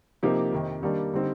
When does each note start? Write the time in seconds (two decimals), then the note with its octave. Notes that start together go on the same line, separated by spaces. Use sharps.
0.23 C3 F3 A#3 D#4 G4
0.53 F2 C3 D#3
0.82 D#3 G3 A#3 D4
1.13 D3 G3 C4 D#4